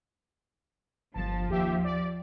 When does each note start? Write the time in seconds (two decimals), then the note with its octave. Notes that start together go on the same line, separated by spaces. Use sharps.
1.14 G1 F3 A5
1.49 D#2 G4 E5
1.84 D5